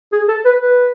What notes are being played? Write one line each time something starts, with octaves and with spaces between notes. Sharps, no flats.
G#4
A4
B4
B4